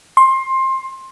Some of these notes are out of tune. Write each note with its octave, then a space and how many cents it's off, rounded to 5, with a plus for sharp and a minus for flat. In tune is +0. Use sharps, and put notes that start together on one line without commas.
C6 +20